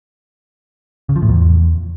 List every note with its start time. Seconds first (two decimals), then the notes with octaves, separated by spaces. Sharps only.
1.09 C#3
1.16 F3
1.22 A2
1.29 E2